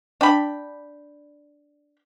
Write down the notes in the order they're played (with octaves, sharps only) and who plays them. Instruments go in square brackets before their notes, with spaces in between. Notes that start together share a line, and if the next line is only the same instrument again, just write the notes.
[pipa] D4 G5 B5